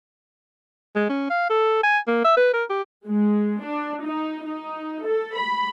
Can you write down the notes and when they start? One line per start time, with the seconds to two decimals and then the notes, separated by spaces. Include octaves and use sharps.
0.96 G#3
1.09 C#4
1.30 F5
1.50 A4
1.83 G#5
2.07 A#3
2.24 E5
2.37 B4
2.53 A#4
2.70 G4
3.07 G#3
3.64 D4
4.05 D#4
4.44 D#4
5.05 A4
5.38 B5